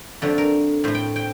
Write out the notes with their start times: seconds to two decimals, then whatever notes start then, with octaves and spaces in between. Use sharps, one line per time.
0.22 F2 D3 F3 A3 A4
0.38 A#4
0.84 A2 A3 C5
0.95 G5
1.16 G5